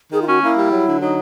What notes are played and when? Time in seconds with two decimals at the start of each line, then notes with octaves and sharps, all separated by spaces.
0.12 D#3 G#4
0.22 F4
0.28 C#4 F#4
0.43 A#3 E4
0.57 G3
0.72 F#3
0.87 D3
1.01 F#3 D#4